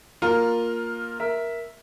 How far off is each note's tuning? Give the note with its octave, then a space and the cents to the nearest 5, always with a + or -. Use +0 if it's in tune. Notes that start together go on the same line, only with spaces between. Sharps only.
A#3 +0 F4 +10 A#4 +0
A#4 +10 E5 +0